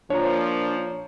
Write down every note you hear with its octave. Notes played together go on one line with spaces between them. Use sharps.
A#2 F3 D4 C#5 A#5